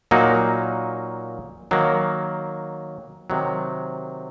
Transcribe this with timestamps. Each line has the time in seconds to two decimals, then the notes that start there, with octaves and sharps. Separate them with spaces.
0.11 A#2 F#3 A#3 D#4 F#4
1.71 D#3 F#3 A#3
3.30 C3 D#3 F#3